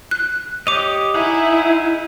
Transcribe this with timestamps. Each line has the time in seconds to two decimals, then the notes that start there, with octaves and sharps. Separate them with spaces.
0.11 F#6
0.67 G4 C#5 D#5 D6 F7
1.14 D#4 E4 G#4 F#5